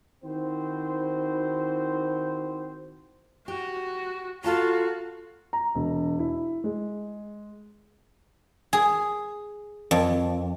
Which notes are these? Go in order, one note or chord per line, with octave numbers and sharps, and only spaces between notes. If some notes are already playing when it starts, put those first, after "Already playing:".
D#3 C4 E4 F#4 C5
F#4 G4
F4 F#4 A4 A5 A#5
A#5
E1
E4
G#3
G#4
F2